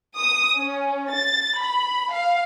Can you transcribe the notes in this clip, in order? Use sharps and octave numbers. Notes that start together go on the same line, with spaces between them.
D#6
C#4
A6
B5
F5